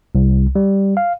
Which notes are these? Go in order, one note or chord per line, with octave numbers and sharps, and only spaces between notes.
C2
G3
F5